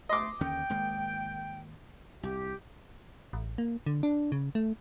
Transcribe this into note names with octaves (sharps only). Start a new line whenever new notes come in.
A3 D#5 C6 D6
D#2 D3 C#4 G5
G#1 G#3 A#3
C2 G4
A1
A#3
D3
D4
C#3
A3